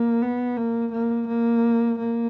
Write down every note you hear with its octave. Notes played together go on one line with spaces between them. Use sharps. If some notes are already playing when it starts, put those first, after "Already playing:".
Already playing: A#3
B3
A#3
A#3
A#3
A#3